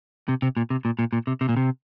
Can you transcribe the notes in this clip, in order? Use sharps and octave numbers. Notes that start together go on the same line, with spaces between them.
C3
C3
A#2
C3
A#2
A#2
A#2
C3
C3
A#2
C3